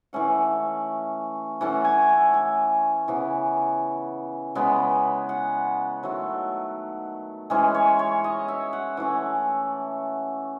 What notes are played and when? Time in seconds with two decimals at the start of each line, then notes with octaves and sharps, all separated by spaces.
0.13 E3 A3 C#4 F#5
1.61 E3 A3 C#4 F#5
1.85 G#5
2.09 A5
2.34 G#5
3.08 C#3 E3 B3
4.55 C#3 G#3 B3
5.29 F#5
6.03 D#3 F#3 A3
7.50 E3 G#3 C#4 G#5
7.75 C#5
7.99 C#5
8.24 D#5
8.48 E5
8.73 F#5
8.97 E3 A3 C#4 G#5